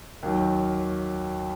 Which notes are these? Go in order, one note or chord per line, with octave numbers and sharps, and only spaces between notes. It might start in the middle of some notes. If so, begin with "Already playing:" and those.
D#2 D#3 F#3